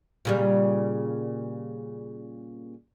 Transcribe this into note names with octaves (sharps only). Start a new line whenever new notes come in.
A#2 C#3 G3